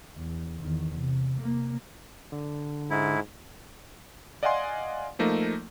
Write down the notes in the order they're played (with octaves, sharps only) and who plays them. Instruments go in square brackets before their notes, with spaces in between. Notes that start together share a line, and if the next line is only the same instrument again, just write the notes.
[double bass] E2
E2 D#3
C3
C3 A#3
[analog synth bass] D3
[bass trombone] G#2 [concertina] E4
[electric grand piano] D5 D#5 F5 F#5 G#5 C6
F3 A3 A#3 D#4